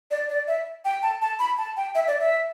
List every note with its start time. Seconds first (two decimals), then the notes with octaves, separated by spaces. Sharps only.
0.11 D5
0.29 D5
0.48 E5
0.85 G5
1.03 A5
1.22 A5
1.39 B5
1.58 A5
1.77 G5
1.95 E5
2.07 D5
2.20 E5